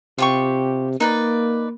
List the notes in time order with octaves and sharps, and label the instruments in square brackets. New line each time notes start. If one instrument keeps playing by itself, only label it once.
[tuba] C3 [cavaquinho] F4 G4 C#6
[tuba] A#3 [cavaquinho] D#4 B4 D5